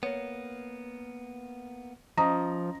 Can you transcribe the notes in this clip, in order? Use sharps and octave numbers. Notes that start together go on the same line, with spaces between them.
A#3 B3 C#5
F3 C#4 D#5 A#5 D#6